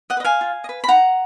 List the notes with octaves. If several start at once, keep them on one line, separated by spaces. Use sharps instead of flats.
D#5 F#5
B4
D#5
F5 G#5
F4
D#5
B4
B5
D#4 F#5 A#5